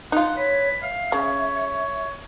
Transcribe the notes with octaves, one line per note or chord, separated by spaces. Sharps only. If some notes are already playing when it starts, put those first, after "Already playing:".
D#4 F4 F#5
B4 C#5
E5 F5
C#3 C#5
C#5